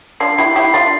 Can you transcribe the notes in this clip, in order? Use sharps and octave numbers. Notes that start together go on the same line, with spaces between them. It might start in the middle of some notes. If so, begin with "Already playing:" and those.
D4 F4 C7
E4 G4 C7
E4 G4 B6
D4 F4 A6